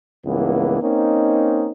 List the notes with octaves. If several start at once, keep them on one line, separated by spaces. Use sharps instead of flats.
C#2 G2 E3 A#3 B3
A#3 C4 C#4 D#4